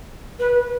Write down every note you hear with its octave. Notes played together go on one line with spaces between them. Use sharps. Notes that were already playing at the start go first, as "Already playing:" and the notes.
B4